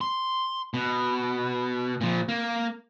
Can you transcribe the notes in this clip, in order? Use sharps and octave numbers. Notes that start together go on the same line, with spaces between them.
C6
B2
A#2 F3
A#3